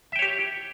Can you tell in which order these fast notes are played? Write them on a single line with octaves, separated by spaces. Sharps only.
E5 G5 C#5 G4